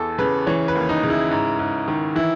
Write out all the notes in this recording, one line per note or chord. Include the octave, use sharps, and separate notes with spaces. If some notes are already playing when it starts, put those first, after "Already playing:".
Already playing: E2 E3 A4
C#3 B4
E3 C#5
B4
D#2
D#4
C#3
E4
G#2
G#2
D#3
E3 E4